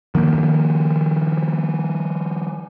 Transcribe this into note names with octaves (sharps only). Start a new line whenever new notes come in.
D#3 F3 A#3